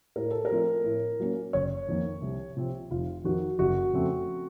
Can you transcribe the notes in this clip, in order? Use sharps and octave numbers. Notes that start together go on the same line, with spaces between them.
A2 A#4
A4
A#4
F3 A3 C4
A2
F#3 A#3 C#4
F#1 C#5
F2 D#3 A#3
C2
C3 F3 C4
F1 F4
F2 D#3 F#4
F#1 F#4
F2 C#3 A3 C4